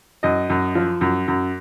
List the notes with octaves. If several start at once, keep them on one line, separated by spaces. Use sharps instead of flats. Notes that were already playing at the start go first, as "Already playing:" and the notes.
F#2 D#5
F#2
F3
F#2
F#2